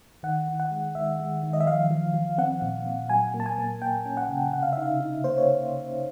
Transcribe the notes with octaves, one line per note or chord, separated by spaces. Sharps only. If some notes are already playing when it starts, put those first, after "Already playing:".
D#3 F#5
D#3
F#5
G#3
D#3 E5
G#3
D#3
D#5
E5
F3 F5
F3
F3
C4 F#5
A#2
A#2
F#3 G#5
A#3
A5
G#5
A#3
A#3 G5
C#4
F#5
C#3
C3 F#5
F5
E5
D#4
F5
D#4
A#3 C5
C#5